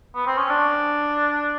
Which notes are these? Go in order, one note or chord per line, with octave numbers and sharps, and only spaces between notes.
B3
C4
C#4
D4